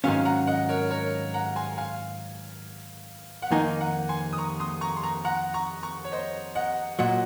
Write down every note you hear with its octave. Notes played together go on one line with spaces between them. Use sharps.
G#2 D#3 F#3 C#4 F5 G#5
F#5 A#5
D#5 F#5
A#4 C#5
A#4 C#5
F#5 A#5
G#5 C6
F5 G#5
F#5
F2 D#3 A#3 D#4 F5 G#5
F#5 A#5
G#5 C6
D#6
A#5 C#6
C6 D#6
A#5 C#6
C6
A#5 C#6
F#5 A#5
A#5 C#6
A#5 C#6
C#5
C5 D#5
D#5 F#5
A#2 F#3 D#5 F#5